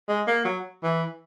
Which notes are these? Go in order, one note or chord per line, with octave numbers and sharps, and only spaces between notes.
G#3
A#3
F#3
E3